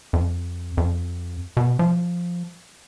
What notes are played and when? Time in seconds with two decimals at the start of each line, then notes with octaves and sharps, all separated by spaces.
0.13 F2
0.77 F2
1.57 B2
1.79 F3